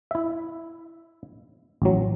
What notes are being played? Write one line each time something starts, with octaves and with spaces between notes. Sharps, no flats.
E4 E5
A1 F#3